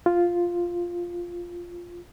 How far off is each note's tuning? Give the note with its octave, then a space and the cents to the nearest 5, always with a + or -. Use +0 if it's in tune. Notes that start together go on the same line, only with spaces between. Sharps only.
F4 +0